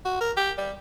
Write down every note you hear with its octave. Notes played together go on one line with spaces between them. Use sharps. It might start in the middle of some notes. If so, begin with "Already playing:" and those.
F#4
A#4
G4
G3